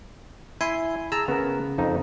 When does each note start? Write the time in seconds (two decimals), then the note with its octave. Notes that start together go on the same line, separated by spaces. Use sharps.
0.61 E4 G#5 C6
1.12 G#4 A5 A#5 E6
1.28 C#3 B3 A#4
1.78 F2 D#4